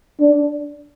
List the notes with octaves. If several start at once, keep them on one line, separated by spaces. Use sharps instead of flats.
D4